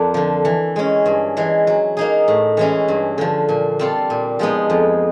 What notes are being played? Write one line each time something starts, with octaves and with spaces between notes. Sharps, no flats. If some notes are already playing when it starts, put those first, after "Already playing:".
Already playing: F2 A#3 D4 F4
D3 F3
E3
G#3 C#4
G2
E3 G#3
F#3
A#3 D#4 G#4
A2
E3 G#3 C#4 E4
G2
D3 F3
A#2
G3 C4 F4 A4
A#2
F3 G#3 B3 D#4
F2